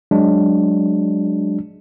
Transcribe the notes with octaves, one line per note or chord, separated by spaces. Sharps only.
F#3 G#3 D4